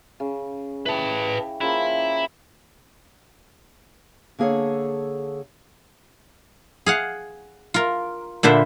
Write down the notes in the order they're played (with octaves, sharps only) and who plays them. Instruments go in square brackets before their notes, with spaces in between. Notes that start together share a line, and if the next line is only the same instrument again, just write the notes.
[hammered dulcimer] C#3
[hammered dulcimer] E4 G4 [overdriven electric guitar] B4 A5
[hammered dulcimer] C#3 F3 A#3 [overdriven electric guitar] E4
[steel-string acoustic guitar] D3 A#3 G#4 A4 C#5
[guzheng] G#4 F5 F#5
F4 A#4
A#2 D3 B4 C5 E5